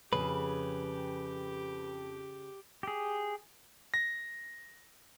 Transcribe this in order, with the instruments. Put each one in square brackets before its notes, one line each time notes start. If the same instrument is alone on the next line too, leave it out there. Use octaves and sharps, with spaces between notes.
[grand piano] F2 [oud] C#3 [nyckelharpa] G4 [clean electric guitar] B4
[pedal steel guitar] G4 G#4
[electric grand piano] A#6